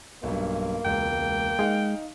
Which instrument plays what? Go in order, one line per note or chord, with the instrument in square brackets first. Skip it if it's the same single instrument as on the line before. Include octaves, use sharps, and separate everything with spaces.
[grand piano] B1 G2 [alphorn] A#3
[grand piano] E1 C#2 [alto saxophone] G5
[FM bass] G#3 [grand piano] D#4 F5